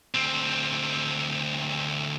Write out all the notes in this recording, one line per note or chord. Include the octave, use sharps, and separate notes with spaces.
D2 C4